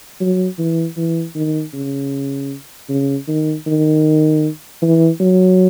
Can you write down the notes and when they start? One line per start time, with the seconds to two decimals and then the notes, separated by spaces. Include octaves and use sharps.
0.20 F#3
0.58 E3
0.97 E3
1.35 D#3
1.73 C#3
2.89 C#3
3.28 D#3
3.67 D#3
4.82 E3
5.20 F#3